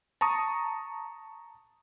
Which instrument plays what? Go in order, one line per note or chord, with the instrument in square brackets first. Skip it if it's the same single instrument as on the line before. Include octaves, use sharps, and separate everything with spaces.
[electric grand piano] A5 A#5 C#6 D#6